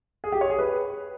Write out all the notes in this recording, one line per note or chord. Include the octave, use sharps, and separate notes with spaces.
G#4
G4
C#5
G#4
B4